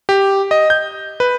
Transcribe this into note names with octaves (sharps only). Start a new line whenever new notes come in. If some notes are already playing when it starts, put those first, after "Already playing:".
G4
D#5
G6
B4